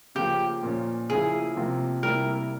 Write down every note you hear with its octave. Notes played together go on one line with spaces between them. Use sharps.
C#3 F3 A#3 G4
A#2 F3 A#3 C#4
C#3 F3 A#3 E4 G#4
C3 F3 A#3
C3 G3 A#3 E4 A#4